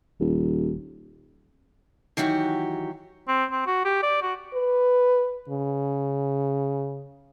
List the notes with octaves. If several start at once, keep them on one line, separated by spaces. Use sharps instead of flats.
D#1
D#3 E3 F#3 F#4 G4
C4
C4
F#4
G4
D5
F#4
B4
C#3